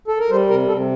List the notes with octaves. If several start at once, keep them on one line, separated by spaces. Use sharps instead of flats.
A4
A#4
G3 C5
C3 A#4
C3 A4